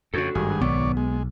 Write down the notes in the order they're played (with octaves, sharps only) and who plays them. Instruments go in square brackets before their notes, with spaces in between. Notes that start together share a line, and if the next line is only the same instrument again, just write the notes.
[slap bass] F2 C#3 [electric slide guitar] D4 F#4 A4
[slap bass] G#1 [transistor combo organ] G2 G#4
[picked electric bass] B1 [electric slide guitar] B3 [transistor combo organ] C#5 D5
[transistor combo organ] G#3